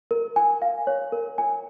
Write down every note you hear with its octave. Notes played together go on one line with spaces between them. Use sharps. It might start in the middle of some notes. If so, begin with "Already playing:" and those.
A#4
G#5
F5
C#5
A#4
G#5